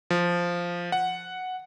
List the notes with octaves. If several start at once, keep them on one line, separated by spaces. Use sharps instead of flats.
F3
F#5